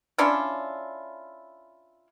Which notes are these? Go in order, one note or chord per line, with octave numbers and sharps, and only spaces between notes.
C#4 D4 E4 F4